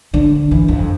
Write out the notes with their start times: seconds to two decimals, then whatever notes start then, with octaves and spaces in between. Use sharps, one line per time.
0.14 D3
0.51 E3
0.68 F2